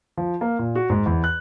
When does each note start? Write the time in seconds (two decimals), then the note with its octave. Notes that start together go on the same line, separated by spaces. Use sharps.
0.17 F3
0.41 A#3
0.59 A#2
0.75 F#4
0.90 G#2
1.06 E2
1.24 F#6